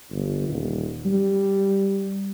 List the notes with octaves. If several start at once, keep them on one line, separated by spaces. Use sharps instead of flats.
G1
D#1
G3